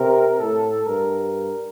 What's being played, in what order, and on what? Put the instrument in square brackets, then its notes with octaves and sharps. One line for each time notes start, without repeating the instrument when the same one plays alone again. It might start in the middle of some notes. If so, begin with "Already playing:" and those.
Already playing: [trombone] C3 [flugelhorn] A#4
[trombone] A2 [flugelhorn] A4
[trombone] G2 [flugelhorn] A#4